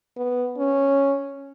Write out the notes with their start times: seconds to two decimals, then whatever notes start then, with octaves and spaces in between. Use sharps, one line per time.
0.17 B3
0.58 C#4